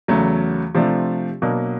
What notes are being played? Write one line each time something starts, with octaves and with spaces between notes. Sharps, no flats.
E2 C#3 F#3 A3
C3 F3 A3 D4
B2 F#3 A#3 D4